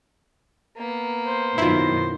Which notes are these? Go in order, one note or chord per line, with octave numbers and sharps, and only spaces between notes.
A#3 B3
C5
F#2 B2 D#3 E4 F4